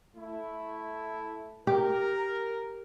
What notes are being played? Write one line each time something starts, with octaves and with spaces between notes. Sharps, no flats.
A3 E4
G4 A#4